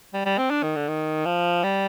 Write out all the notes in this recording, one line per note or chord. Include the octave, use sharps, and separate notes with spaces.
G3
G3
C4
D4
D#3
D3
D#3
F3
G3